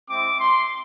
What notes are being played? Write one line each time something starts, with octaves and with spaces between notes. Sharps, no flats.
G#3 C4 E4 D6
C6